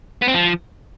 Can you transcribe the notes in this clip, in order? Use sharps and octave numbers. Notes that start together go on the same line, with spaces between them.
B3
C4
F3